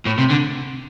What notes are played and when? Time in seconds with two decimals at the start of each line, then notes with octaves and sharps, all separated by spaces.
0.05 A2
0.18 C3
0.30 D3